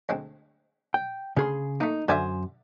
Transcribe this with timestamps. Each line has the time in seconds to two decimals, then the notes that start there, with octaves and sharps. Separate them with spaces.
0.09 D2 G#3 C4
0.94 G5
1.37 D2 C#3 G#4 C6
1.80 A3 A#3 D#4
2.08 F#2 D3 C5 D5 E5 G#5